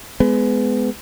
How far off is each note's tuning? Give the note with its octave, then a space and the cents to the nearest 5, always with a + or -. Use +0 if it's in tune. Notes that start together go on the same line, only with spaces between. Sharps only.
G#3 +20 B3 +25